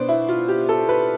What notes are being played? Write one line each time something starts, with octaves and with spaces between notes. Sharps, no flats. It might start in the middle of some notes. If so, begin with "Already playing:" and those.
Already playing: B2 B3 D4 C5 D5
E4
F4
G4
A4
B4